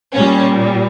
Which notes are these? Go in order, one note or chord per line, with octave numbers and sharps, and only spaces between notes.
A#2 G3 C#4